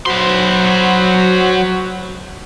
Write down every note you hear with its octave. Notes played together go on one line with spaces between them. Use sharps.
F#3 F#4 C5 B5 C6